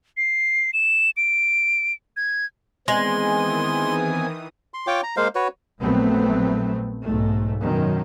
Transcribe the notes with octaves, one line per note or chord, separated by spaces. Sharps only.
C7
E7
D7
G#6
D#3 E3 G#3 B3 C4 G#5 C6 D#6
C6
F4 C#5 G5 D6
A#5
G#3 A#3 C5 F5
F#4 B4 C#5
A#1 A#2 F#3 A3 B3 C4
B1 G#2 A3
F#2 B2 D#3